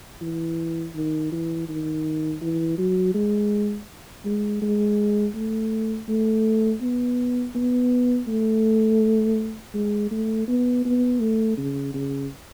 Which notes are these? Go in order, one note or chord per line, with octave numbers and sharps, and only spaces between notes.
E3
D#3
E3
D#3
E3
F#3
G#3
G#3
G#3
A3
A3
B3
B3
A3
G#3
A3
B3
B3
A3
C#3
C#3